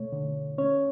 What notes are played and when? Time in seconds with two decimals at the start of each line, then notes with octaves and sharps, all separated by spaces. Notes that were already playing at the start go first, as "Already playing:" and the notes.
Already playing: B2 A3 C#5
0.12 D3
0.58 C#4 C#5